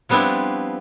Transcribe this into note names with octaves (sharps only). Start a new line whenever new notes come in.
F3 G3 B3 C4 D4 E4